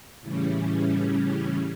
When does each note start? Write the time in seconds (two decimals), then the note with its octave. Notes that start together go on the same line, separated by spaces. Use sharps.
0.22 A2 C#3 E3 G3 C#4